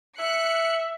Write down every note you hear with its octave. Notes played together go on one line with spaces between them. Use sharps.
E5 F#6 C#7